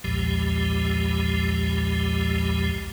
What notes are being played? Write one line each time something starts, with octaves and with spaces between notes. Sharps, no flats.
B1 E2 A#2 F3 G#3 G4